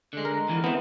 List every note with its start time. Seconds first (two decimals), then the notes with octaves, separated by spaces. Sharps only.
0.13 D3 G#3
0.25 A#4
0.48 E2 E3 F3
0.64 E3 B3 C4